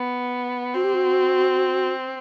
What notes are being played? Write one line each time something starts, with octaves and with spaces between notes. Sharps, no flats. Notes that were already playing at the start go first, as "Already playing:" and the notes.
Already playing: B3
C4 F#4
G4
F#4